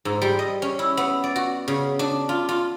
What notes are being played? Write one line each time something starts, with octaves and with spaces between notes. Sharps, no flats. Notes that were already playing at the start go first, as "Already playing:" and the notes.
G#2
G3
D#5
C#4
E4
B3
D5
F#4
C#3
D4
F4
F4